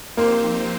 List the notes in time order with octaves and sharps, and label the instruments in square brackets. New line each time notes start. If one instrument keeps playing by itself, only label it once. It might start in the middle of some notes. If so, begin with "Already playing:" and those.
[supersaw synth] F3 C4 D#4 G4 C5 [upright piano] A#3